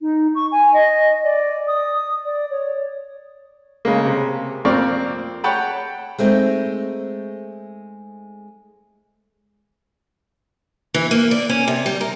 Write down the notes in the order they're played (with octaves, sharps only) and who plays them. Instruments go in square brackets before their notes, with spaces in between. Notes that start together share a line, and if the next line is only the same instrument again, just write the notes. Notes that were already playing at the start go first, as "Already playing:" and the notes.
[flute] D#4
C#6
G#5
D#5
D5
D#6
D5
C#5
[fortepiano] C#3 G#3 A#3
C3
F2 A#3 C4 D5 C#6 F6
C#5 F#5 G5 A5 B5
[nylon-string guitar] G#3 A3 C4 D#4
[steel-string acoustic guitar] E3
A#3
D5
C#4
C3
G3
A#4